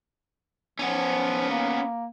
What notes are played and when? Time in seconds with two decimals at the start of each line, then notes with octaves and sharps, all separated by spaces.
0.79 F3 B3 C#4
1.50 A#3